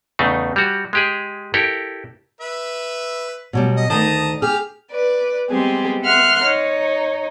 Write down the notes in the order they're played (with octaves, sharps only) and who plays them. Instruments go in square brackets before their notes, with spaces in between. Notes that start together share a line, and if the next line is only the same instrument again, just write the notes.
[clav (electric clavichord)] E2 C#3 A3 D#4
G3 F#4
G#3 G4 G#4
E4 G4 A4 A#4 D5
[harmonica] B4 E5
[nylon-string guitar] B2 F#3 G3
[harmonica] D#5
[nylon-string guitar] D2 D#3 [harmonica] A5 A#5 D#6
[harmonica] G4 F6 [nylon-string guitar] G#4
[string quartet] B4 D5
G3 G#3 B3 C4 G4 G#4
E5 F#5 C6 F6 F#6
D#4 C#5